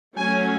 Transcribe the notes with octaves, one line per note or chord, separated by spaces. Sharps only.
F#3 A3 C#4 G#5